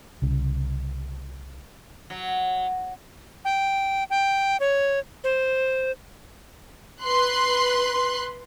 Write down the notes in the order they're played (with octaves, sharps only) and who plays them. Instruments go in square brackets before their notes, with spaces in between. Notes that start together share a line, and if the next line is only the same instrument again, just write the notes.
[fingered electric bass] C2 C#3
[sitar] F#3
[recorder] G5
G5
C#5
C5
[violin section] B4 C6 F#6